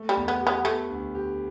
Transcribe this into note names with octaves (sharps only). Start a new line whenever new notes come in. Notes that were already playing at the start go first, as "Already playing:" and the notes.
Already playing: A3
G3
E2
B3
G4
B3
A3 B3
D2
G4